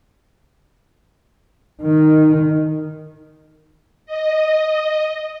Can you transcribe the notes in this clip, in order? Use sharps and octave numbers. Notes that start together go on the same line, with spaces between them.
D#3
D#5